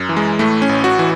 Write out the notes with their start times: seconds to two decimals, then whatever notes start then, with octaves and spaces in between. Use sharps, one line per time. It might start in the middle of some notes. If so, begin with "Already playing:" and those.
Already playing: F#2
0.09 E3
0.17 G#3
0.39 A2 A3
0.62 C#4
0.69 A1
0.84 F#4
0.99 E3